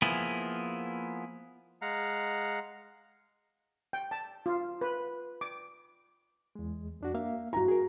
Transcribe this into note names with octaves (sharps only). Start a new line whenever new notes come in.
F3 A#3 B3 E4 G#4
G#3 F5 F#5 A#5
G5
A5
F4
B4
D6
E2 G#3
F2 D4 F#4
A#3 E5 F5
G2 E4 F#4 A#5
G#4 A#4